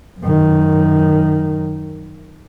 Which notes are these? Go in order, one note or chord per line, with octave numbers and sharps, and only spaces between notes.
F#2 D#3